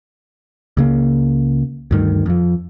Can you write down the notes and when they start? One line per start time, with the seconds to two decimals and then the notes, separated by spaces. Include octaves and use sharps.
0.77 C#2 C#3 A#3
1.91 D2 G2 D#3
2.26 F2 F3